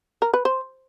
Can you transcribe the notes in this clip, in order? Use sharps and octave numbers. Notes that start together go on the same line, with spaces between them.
A#4
B4
C5